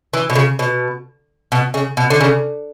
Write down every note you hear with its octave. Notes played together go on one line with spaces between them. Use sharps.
E3
B2
C#3
B2
B2
C#3
B2
D3
C#3